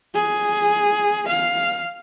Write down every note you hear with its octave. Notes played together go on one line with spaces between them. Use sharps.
G#4
F5